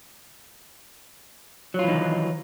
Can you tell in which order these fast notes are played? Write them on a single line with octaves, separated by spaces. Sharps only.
F#3 F4 E3 D#4 D#3